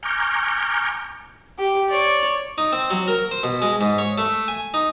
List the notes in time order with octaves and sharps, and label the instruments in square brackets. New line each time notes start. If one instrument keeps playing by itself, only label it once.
[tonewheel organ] G#5 A#5 C#6 D6 F6 G6
[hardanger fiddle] G4
C#5 D5
[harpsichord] D#4
C4
F#3
A#4
C5
B2
G#3
G#2
C#5
A3
G#5
D#4